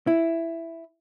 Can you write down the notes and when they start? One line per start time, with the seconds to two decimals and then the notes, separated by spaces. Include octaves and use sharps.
0.07 E4